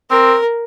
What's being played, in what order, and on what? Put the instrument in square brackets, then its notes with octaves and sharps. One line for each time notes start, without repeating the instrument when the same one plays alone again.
[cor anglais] C4 [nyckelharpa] A#4